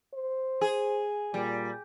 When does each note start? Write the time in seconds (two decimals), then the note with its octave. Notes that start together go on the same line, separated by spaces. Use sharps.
0.14 C5
0.61 G#4
1.34 A#2 G3